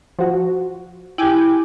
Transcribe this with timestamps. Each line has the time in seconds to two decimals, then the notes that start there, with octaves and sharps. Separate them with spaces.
0.19 F3 F#4
1.18 E4 G4 G5 G#5 D6